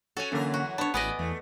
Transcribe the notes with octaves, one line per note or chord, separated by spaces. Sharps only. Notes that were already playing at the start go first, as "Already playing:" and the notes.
C#4 F#4 A4 G#5
F#2 D3 E3 A#3 C#4 A#4
F#4
B3 D4 C#5 A5
A1 B3 F#4 B4 D5 D#5 G#5 D#6
E2 A3